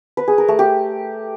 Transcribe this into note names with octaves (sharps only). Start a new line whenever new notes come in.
B4
G#4
A#4
A3
G4